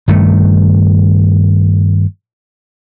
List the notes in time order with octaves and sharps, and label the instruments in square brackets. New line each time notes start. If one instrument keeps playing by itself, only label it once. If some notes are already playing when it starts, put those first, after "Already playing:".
[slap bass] G2 D#3 A3